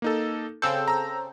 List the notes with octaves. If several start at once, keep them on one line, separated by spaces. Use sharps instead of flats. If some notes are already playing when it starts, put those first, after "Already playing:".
A#3 D#4 A4
C#3 C4 A4 E6 G6
A#5 E6